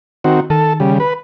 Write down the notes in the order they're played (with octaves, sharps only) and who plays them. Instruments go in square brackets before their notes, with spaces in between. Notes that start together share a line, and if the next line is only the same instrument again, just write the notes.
[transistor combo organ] D#3 C4 F#4
[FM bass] D#3 [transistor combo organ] A4
[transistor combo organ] C#3 G3
B4